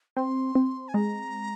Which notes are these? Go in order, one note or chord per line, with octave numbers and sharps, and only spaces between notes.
C4 C6
C4
G#5
G#3 A#5